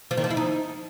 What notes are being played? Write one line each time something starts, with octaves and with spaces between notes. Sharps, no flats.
F3
D#3
F3
E4
D#4